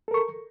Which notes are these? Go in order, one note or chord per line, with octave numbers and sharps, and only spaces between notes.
A4 A#4 C#6